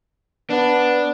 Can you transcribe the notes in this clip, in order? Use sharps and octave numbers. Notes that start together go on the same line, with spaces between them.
B3 D4